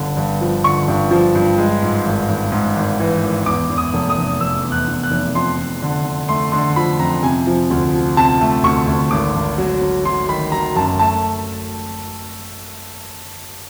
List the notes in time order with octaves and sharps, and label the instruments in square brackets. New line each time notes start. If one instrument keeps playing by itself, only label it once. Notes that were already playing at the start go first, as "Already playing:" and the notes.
Already playing: [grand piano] G1 D3
G2
F3
D3 C#6
G2
F3
G2
G#3
G#2
G#1
G#1
G#2
G#1
E3
G#1
E2 D6
E2
D#6
F1
D#6
F1
F1 E6
E2
F#6
E2
F#6
F1
F2 C6
F2
D3
D3
A3 C6
D3 C6
F3 B5
F2 A#5
C3 G#5
F3
D2
F3
C3 A5
A3
D2 C#6
D2
G#1 D6
G#1
F#3
F#3
F#3 C6
D#3 B5
F#3 A#5
F#2 A5
A3 A5